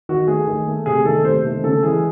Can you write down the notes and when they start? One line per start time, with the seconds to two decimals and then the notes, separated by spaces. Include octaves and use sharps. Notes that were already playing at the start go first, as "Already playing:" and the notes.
0.09 D#3 F#4
0.27 A3 G#4
0.47 D#3
0.67 A3
0.86 C3 G#4
1.05 D#3 A3 A4
1.24 C3 C5
1.45 D#3 A3
1.64 C#3 A4
1.83 E3 G#3 G#4